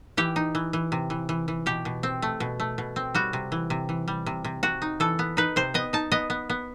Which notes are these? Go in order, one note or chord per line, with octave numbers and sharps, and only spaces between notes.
E3 G4
D#4
E3
E3
C3
E3
E3
E3
B2 G4
B2
C4
A3
B2
A3
B2
C4
G3 F#4
C3
E3
C3
E3
G3
C3
C3
C3 F#4
D#4
E3 A4
B3
D#4 B4
C3 C5
B3 D#5
D#4 A5
B3 D#5
B3
B3